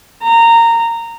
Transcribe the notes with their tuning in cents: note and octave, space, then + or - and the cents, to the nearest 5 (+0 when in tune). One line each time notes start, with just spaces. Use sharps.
A#5 -15